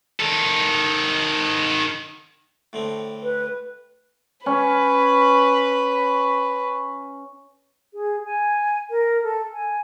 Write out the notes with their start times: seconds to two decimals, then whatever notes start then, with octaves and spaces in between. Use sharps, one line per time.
0.20 D#3 A4
2.73 A2 D3 C4
3.23 B4
4.46 C#4 B4
7.94 G#4
8.25 G#5
8.90 A#4
9.23 A4
9.52 G#5